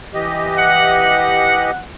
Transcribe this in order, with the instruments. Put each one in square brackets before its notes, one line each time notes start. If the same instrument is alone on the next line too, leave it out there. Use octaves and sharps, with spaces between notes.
[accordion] E3 G4 D#5
[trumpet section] F#5